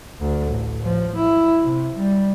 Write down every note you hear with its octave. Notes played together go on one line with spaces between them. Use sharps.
D2
A1
F3
E4
C3
G3